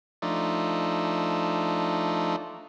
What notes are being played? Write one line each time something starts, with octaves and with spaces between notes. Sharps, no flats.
F3 A3 D4 D#4